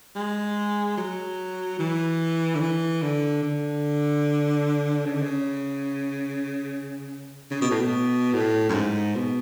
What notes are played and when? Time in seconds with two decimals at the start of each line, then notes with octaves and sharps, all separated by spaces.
0.16 G#3
0.97 F#3
1.79 E3
2.55 D3
2.60 E3
3.02 D3
3.43 D3
5.06 C#3
5.14 D3
5.22 C#3
7.51 C#3
7.61 B2
7.71 A2
7.80 B2
8.33 A2
8.69 F#2
8.74 G#2
9.15 B2